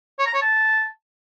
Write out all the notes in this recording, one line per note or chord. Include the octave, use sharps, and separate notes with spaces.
C#5
A#5
C#5
A5